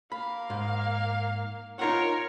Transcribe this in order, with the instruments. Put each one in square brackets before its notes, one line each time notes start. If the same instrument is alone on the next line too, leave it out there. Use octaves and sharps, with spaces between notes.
[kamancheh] A#3 F5 [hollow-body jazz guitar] B5
[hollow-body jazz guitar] G#2
[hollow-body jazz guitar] D#4 F4 F#5 [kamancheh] A#4 C#5